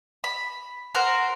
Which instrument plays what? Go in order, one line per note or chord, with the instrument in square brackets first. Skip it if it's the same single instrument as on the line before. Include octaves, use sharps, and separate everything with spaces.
[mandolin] B5
F#4 A#4 C5